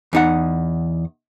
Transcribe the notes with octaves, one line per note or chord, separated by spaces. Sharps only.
E2 D#4 F#5